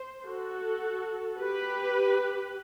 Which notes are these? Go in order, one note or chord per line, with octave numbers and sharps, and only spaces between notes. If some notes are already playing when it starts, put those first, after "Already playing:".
Already playing: C5
F#4 A4
G4 B4